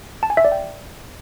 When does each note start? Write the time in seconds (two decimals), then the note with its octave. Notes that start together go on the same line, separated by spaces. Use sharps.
0.23 A5
0.30 G#5
0.37 E5
0.45 D5
0.52 G5